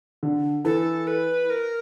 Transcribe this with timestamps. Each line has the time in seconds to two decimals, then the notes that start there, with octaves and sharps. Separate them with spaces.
0.23 D3
0.65 E3 A4
1.07 B4
1.50 A#4